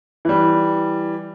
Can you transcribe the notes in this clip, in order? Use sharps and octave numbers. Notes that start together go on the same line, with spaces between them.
E3 G3